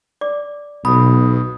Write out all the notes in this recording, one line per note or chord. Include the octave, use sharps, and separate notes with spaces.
D5 D6
B1 B2 B5 D#6